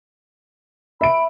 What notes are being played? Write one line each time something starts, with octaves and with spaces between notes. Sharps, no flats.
E5 B5 D7